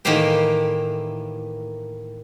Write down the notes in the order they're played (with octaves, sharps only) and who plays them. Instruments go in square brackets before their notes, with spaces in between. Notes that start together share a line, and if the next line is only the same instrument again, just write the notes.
[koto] A2 D#3 E3 A#3 G4 C5